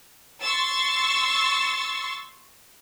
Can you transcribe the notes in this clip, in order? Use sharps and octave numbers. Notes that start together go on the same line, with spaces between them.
C6 C#6 E6 A6